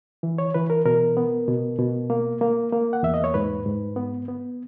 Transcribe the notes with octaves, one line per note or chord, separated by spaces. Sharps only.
E3
C#5
E3 B4
A#4
B2 A#4
B3
B2
B2
A#3
A#3
A#3
F#5
E2 E5
D#5
C#5
G#2 B4
G#2
B3
B3